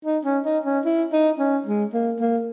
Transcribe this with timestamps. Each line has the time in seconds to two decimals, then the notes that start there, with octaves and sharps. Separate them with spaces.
0.05 D#4
0.25 C#4
0.45 D#4
0.65 C#4
0.85 E4
1.13 D#4
1.39 C#4
1.66 G#3
1.93 A#3
2.20 A#3